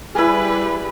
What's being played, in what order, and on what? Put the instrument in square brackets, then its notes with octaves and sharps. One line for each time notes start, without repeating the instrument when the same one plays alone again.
[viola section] G3 G4 B4 [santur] E4 G#4